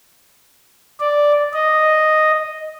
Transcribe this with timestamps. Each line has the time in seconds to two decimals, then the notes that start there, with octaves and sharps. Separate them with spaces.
1.00 D5
1.53 D#5